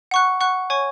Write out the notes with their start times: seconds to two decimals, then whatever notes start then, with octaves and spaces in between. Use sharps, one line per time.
0.11 F#5 C#6 F#6
0.41 F#5 C#6 F#6
0.70 C#5 G#5 C#6